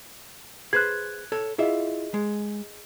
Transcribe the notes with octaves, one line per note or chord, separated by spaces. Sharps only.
G#4 B4 C5 F#6 G#6
A4 C#5
E4 F4 G#4 D#5 E5
G#3